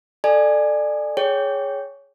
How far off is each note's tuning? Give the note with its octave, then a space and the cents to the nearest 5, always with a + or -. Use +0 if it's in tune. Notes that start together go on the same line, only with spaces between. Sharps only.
A4 +0 D5 +25 G#5 -10
G#4 +0 C#5 +10 G5 +0